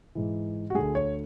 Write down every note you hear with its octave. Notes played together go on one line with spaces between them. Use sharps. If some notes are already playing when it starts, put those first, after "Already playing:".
G#2 E3
F#4
D2 D3 G#4
C#5